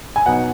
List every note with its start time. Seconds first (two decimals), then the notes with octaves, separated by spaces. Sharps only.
0.16 G#5
0.26 B2 F#3 B3 D#4 F#5